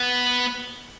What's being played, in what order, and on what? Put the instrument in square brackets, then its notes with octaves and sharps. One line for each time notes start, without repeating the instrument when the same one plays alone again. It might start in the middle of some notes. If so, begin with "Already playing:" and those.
Already playing: [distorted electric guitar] B3